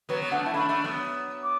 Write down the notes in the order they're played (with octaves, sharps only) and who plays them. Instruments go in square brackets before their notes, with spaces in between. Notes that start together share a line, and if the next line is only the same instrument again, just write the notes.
[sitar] F#3 B3 [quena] B4
[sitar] B3
[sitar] A3 D4 [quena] F#5
[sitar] E4 [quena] A5
[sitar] A3 D4 [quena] B5
[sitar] A3 D4
F#3 B3
[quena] D6